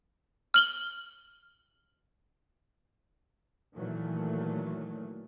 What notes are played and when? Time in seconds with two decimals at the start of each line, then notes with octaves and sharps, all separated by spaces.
0.54 F6 F#7 G7
3.75 A#2 D#3 E3 F#3 A3